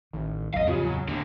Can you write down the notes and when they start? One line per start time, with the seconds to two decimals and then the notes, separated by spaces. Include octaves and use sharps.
0.13 A1 D#3
0.54 D1 A1 E2 F#3 D#5 F5
0.67 F2 C#3 C4 F4 G4
0.85 F#3 G#5
1.09 D#2 A2 D3